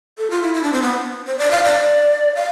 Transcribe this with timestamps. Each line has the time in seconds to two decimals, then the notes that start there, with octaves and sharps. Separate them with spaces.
0.18 A4
0.30 F4
0.42 E4
0.54 E4
0.63 D4
0.72 C4
0.82 B3
1.27 C5
1.38 D5
1.51 F5
1.63 D5
2.35 F5